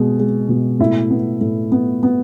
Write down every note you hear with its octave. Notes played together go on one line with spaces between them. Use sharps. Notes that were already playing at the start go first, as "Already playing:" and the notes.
Already playing: B2 G#3
G#3
B2
A2 E4 E5
B3
A2
B3
B3